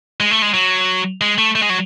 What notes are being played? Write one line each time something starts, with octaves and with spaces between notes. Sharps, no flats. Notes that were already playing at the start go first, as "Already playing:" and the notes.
G#3
A3
G#3
F#3
G#3
A3
A3
G#3
F#3